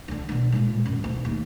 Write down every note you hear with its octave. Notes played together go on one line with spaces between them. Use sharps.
D2 D3
B2 D3
A#2 G#3
F#2 D#3
E1 D2
D#2